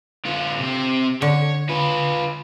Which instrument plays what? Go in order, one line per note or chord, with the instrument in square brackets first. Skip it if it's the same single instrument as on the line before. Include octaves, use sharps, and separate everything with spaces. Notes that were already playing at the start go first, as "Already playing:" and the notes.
[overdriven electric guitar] D3 F4
C3 C4
[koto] D3 [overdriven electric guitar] C#5
[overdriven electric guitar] F4 B4